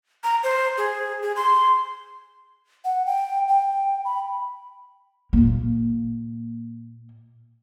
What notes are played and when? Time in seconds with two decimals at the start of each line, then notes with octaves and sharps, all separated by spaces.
0.24 A#5
0.43 C5
0.78 G#4
1.22 G#4
1.36 C6
2.85 F#5
3.06 G5
3.48 G5
4.05 B5
5.33 A#2 A#3